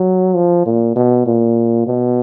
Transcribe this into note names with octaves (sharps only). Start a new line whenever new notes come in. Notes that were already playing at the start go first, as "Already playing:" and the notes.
Already playing: F#3
F3
A#2
B2
A#2
B2